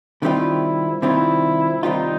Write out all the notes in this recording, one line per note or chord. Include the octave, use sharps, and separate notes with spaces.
C3 D#3 G3 C4 E4 F4
C3 D#3 G3 C4 E4 F4
C3 D#3 G3 C4 D#4 F4